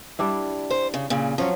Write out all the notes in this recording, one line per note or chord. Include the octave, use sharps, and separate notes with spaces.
G3 D4 E4
C5
C#3
A#2 C#3
F3 F#3 C#4